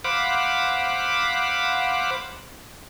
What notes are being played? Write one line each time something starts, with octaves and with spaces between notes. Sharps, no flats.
C5 F5 F#5 B5 D6